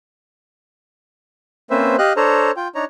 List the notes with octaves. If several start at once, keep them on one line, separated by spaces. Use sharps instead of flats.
A#3 C4 C#4 B4 C5 E5
G4 D#5 F5 F#6
D4 A4 C5 C#5 A#5
F4 G5
D4 D#4 C#5 A#5